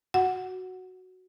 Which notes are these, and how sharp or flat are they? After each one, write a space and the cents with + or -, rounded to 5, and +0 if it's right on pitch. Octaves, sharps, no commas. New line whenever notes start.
F#4 +0 F#5 +0